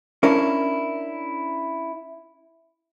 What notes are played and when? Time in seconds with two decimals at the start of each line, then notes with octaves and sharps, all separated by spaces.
0.23 C#4 D4 E4 A#4